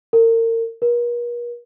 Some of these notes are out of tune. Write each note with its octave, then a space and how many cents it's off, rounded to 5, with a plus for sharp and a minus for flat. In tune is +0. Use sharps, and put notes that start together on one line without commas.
A#4 -35
A#4 +45